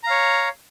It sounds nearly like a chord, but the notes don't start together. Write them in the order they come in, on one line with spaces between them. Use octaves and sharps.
A#5 F5 C#5